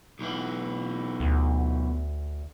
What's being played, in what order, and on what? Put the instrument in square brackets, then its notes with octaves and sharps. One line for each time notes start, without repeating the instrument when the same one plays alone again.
[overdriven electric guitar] B1 E3
[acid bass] D2